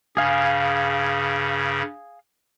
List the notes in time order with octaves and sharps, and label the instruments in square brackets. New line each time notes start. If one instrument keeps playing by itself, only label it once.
[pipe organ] G2 C#3 [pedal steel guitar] G#4 F5 G#5